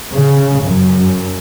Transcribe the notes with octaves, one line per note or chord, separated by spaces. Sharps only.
C#3
F#2